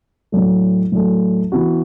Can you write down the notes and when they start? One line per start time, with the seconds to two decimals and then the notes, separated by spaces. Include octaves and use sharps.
0.32 A2 F#3 A3
0.92 A2 F#3 A3
1.52 E3 B3 F#4